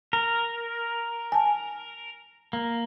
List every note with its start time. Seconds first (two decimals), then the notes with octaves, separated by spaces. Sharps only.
0.13 A#4
1.32 G#5 A5
2.53 A#3